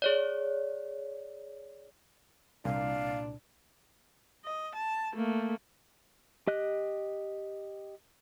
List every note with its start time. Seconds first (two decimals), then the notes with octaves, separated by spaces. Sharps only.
0.02 G#4 C#5 D5
2.65 C2 A#2 D4 F5
4.45 D#5
4.75 A5
5.15 A3 A#3
6.47 G4 D#5 F#6